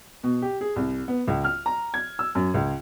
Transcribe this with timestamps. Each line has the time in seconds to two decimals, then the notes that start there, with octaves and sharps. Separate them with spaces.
0.23 B2
0.42 G4
0.61 G#4
0.76 C2
1.08 B3
1.28 C#2
1.44 F6
1.66 A#5
1.94 G#6
2.19 E6
2.35 F#2
2.54 C#2